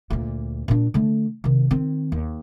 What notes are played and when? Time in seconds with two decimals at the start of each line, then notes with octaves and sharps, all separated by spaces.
0.10 D2 A#2
0.68 A#2 D4
0.94 D3 A3
1.44 C3 D#3
1.71 D#3 C4
2.12 D#2